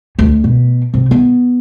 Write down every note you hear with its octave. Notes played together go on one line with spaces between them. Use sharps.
D2
B2
C3
B3